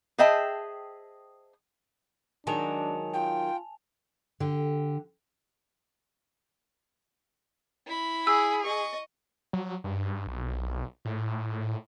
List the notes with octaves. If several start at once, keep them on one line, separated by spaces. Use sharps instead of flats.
G#4 C5 D#5 E5 G5 A5
D#3 F#3 G#3 D4 G#5 A5 F7
F4 G5
D3 G4
E4 B5
G#4 E6
D#5 C#6
F#3
G2
B1
A2